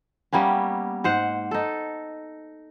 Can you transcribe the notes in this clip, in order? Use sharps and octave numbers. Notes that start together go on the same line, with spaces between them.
G3 A#3 B3 C#4
G#2 C5 F#5
D#4 A4